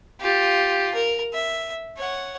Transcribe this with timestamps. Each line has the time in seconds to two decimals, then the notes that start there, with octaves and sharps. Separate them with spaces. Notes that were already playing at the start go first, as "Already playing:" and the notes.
0.21 F4 G4
0.95 A#4
1.33 E5
1.97 C#5 F#5